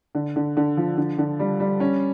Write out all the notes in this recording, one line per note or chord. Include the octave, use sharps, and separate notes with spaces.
D3
D3
D3
F3
D3
D3
G3
G3
C#4